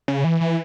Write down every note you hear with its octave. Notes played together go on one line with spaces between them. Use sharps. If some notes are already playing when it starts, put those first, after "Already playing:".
C#3
E3
E3